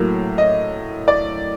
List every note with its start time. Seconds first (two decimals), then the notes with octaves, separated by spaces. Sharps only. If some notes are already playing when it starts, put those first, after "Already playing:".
Already playing: A2 F#3 A#3
0.38 D#5
1.08 D5